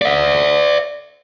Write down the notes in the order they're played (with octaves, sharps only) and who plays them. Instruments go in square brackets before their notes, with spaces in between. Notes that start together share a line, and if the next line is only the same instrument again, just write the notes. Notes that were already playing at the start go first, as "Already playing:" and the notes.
[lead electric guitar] D5 E5